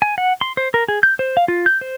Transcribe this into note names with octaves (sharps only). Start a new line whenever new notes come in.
G#5
F#5
C6
C5
A#4
G#4
G6
C5
F5
F4
G6
C5